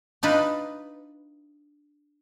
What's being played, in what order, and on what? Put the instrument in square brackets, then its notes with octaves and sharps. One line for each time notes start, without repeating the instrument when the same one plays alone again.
[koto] D4 D#4 F4 B4